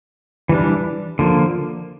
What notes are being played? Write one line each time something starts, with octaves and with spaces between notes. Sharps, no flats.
E3 G3 D4
D3 F3 A#3